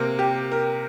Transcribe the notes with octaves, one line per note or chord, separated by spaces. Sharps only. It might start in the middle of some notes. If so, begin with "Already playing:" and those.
Already playing: C3 A#3 A#4
G4
A#4